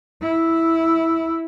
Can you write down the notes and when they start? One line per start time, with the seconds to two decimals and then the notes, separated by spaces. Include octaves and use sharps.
0.22 E4